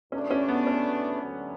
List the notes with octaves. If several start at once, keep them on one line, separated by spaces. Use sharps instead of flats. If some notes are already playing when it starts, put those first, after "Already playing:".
E2 B2 A3 C#4 D4
C#4
B3
C#4
D2 D3 F#3